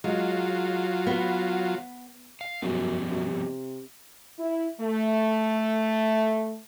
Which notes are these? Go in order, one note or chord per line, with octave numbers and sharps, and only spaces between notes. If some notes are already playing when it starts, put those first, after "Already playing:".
F#3 G#3 F4
B3
F5
F#2 F3 G3 B3
F#2
C3
E4
A3